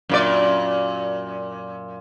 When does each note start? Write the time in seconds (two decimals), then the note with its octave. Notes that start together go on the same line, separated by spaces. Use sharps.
0.09 F#2 A#2 D5